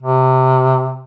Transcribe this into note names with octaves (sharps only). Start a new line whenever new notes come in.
C3